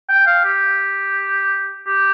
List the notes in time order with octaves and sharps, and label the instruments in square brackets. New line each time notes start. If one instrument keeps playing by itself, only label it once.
[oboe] G5
F5
G4
G4